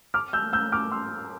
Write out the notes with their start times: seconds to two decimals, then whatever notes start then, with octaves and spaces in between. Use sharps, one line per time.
0.14 D6 F6
0.33 E6 G6
0.53 E6 G6
0.72 D6 F6
0.92 C6 E6